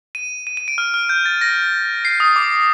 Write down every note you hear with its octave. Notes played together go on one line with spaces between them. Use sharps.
D#7
D#7
D#7
D7
F6
F6
G6
A6
A#6
C7
D#6
D6